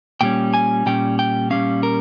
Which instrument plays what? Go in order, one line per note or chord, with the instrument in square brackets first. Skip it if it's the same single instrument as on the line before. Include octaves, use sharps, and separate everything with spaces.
[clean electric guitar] A#2 G3 C#4 G5
G#5
A#2 G3 C#4 G5
G5
A#2 G3 C#4 F5
A#4